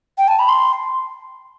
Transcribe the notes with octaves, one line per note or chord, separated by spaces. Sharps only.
G5
A5
B5
C6